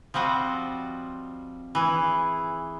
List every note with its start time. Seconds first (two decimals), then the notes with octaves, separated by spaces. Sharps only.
0.14 F3 G3 C4 F#4 D#5
1.75 E3 G#4